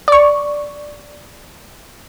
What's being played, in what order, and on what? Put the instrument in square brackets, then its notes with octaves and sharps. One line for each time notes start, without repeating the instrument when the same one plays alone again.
[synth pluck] D5 C#6